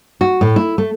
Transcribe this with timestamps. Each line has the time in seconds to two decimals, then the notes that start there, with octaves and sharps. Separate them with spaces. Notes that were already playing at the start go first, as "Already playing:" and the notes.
0.21 F#4
0.41 A2
0.56 E4
0.78 A3